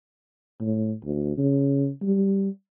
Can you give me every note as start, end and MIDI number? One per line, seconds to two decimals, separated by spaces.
0.60 0.93 45
1.03 1.37 38
1.37 1.89 49
2.02 2.49 55